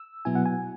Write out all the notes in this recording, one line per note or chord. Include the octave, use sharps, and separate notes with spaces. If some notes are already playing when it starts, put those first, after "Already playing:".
Already playing: E6
B2 F#3 B3 E4 G#5
F#5
G#5